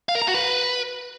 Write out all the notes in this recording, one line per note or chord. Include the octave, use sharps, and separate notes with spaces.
F5
A#4
A#5
F#4
B4